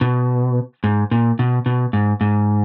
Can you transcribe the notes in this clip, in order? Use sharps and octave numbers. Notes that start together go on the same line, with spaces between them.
B2
G#2
A#2
B2
B2
G#2
G#2